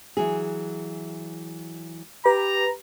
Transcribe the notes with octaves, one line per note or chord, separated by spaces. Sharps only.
E3 F#3 G#4
G4 B4 A#5